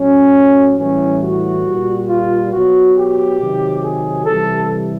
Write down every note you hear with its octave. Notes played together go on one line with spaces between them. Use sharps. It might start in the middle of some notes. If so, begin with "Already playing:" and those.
Already playing: A2 F#3 C#4
A2 E3 G3 C#4
F#4
A#2 G3
F4
B2 F#3 F#4
G4
C3 D#3 F#3
G#4
C3 E3 G3 A4